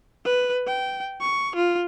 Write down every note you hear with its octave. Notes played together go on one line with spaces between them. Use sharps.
B4
G5
C#6
F4